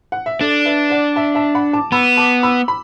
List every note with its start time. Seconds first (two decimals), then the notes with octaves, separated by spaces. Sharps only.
0.12 F#5
0.26 E5
0.40 D4 A4 D5
0.66 B4 E5
0.90 D5 F#5
1.16 E5 A5
1.35 E5 A5
1.55 F#5 B5
1.73 A5 D6
1.92 B3 B5 E6
2.17 A5 D6
2.43 B5 E6
2.68 B5